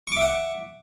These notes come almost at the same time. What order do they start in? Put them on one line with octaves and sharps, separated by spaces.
C#6 D6 E5 F#5